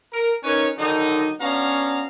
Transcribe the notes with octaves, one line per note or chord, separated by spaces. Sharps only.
A#4
C#4 D#4 A#4 B4 C#5
D3 D#3 F#3 D#4
B3 C#4 D4 F#4 F5 A#5